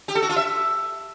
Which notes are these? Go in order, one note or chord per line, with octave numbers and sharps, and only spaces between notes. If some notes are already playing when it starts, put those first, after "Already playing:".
G4
A4
F#4
F4
E5